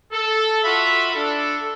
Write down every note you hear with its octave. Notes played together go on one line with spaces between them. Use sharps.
A4
F4 F#4 E5 B5
D4 A4